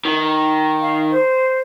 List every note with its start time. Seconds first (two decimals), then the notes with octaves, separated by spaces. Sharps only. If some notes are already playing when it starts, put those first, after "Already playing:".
0.05 D#3
0.81 F5
1.11 C5